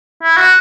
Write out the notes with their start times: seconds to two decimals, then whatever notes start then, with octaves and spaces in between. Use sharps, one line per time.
0.22 E4
0.37 F#4